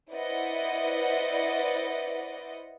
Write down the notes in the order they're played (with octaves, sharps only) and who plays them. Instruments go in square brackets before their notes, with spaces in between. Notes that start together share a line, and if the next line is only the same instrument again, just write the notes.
[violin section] E4 B4 C5 D5 D#5 F#5